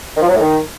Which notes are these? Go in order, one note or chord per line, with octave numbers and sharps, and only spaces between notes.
D#3
F3
F#3
A2
D#3